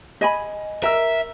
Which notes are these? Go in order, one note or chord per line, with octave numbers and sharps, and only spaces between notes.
D#5 G#5 B5
A#4 E5 E6